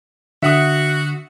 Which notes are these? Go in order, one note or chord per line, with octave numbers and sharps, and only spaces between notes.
D3 F#4 E5 F#5 D#6